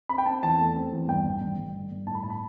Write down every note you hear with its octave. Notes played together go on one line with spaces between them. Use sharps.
C4 B5
G5
C4 A5
E2 A5
A3
C4
E2
G2 G5
A1
G2
G2
D3
G2
A2 A5
B5
A2 A5
B5